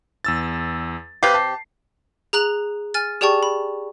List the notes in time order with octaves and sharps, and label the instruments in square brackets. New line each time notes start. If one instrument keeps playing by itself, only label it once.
[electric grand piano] E2 E6 A6
[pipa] C3 G4 [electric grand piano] B4 F5 C7
[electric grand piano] A5
[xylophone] G#4 A#5 F#6 F#7
G#5 F6 A6
G4 G#4 D5 G5 A5 C#6
B5